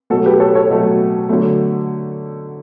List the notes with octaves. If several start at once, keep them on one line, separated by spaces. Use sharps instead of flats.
B2 F#3 A3 F#4 A4
G4 B4
A4 C#5
A4 C#5
B2 F#3 A3
D3 F#3 A3